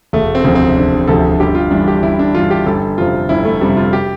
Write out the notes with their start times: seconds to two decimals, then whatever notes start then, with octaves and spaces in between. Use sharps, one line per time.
0.13 E1 A3
0.35 C4
0.44 D2 C3 F3
0.55 C4
0.77 E1 D4
1.07 D2 C3 F3 A4
1.40 G1 G4
1.55 F4
1.71 G2 E3 D4
1.88 G4
2.02 G1 E4
2.19 D4
2.35 G2 E3 F4
2.51 G4
2.66 G1 A4
2.98 F2 C3 F3 F4
3.29 G1 E4
3.45 A3
3.61 F2 C3 F3 G3
3.77 F4
3.93 G4